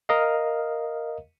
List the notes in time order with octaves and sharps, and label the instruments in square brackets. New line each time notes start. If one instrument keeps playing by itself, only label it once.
[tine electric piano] A#4 D#5 F5